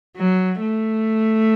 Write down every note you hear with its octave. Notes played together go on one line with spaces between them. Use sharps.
F#3
A3